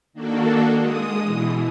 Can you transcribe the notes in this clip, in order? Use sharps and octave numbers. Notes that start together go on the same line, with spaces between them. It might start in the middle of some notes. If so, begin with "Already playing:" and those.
D#3 A#3 D4 F#4 A4
G#3 D#6
B2 E3